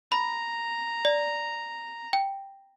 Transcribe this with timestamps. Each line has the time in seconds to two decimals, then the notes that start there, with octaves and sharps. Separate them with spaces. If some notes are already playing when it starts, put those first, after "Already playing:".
0.12 A#5 B5
1.05 D5
2.13 G5